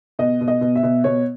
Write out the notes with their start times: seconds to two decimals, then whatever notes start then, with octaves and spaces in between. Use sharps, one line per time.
0.19 B2 D#5
0.41 B2
0.48 D#5
0.61 B2
0.76 E5
0.83 B2
1.04 B2 C#5